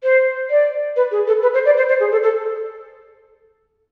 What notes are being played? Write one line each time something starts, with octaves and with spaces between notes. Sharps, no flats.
C5
D5
B4
G#4
A4
B4
C5
D5
C5
C5
G#4
A4
A4